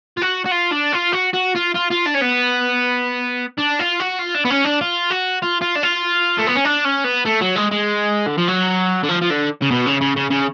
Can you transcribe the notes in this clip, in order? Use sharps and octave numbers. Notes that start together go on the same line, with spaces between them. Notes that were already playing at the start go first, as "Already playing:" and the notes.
F4
F#4
F#4
F4
D4
F4
F#4
F#4
F4
F4
F4
D4
C#4
B3
D4
F4
F#4
F4
D4
B3
C#4
D4
F4
F#4
F4
F4
D4
F4
A3
B3
C#4
D4
C#4
B3
A3
F#3
G#3
G#3
D3
F3
F#3
D3
F3
F3
D3
C#3
B2
C#3
C#3
C#3
C#3